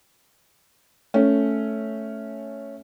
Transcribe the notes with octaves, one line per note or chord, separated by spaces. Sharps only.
A3 C#4